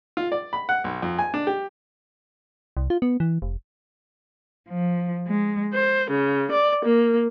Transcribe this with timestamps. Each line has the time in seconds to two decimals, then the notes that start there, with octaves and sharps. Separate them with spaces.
0.17 F4
0.32 D5
0.53 B5
0.69 F#5
0.84 B1
1.02 F2
1.19 G#5
1.34 D4
1.47 G4
2.77 C2
2.90 F4
3.02 B3
3.20 E3
3.42 F1
4.69 F3
5.27 G#3
5.73 C5
6.10 C#3
6.51 D5
6.84 A#3